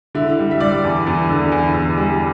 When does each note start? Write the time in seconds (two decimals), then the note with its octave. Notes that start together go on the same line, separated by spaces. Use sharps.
0.15 D3 E4
0.39 G3
0.51 E5
0.60 G3 D5
0.84 E2
1.07 E2
1.29 D3
1.52 E2
1.74 E2
1.97 G3